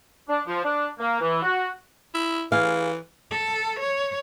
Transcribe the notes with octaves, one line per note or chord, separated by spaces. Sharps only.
D4
F3
D4
A#3
E3
F#4
E4
E3 G#4 F5
A4
C#5